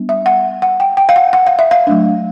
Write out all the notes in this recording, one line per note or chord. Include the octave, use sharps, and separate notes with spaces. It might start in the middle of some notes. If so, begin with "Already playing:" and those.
Already playing: G3 B3 D4
E5
F#5
F#5
G5
G5
F5
F#5
F#5
F5
E5
F5
F#3 A3 D4